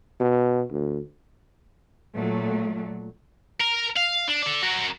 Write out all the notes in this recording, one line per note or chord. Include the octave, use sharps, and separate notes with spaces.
B2
D2
A#2 F#3 A3
A#4
F5
D4
A4 D5
F#4 A#4